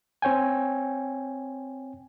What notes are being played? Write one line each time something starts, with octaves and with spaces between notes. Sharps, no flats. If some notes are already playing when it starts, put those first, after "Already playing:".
C4 C#5 G5 G#5